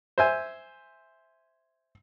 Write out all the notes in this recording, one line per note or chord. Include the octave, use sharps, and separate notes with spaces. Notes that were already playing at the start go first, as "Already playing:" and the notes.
C5 E5 G#5